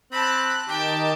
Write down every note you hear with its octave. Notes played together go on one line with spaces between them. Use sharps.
C4 A5 B5 F#6
D#3 D#4 G4 G5 A5